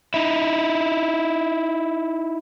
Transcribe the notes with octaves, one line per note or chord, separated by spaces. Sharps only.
D#4 E4